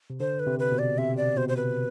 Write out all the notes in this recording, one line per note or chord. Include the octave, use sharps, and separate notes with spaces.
C3
D3 C5
B4
C3
B4
B2
D5
C3 E5
D5
B2 C5
C5
B4